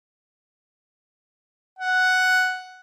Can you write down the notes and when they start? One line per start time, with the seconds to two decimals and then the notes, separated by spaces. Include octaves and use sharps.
1.79 F#5